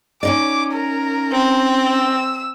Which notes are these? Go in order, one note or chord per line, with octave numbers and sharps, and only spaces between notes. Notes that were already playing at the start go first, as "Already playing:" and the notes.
C#4 D#4 D5 D6
A#4
C4
E6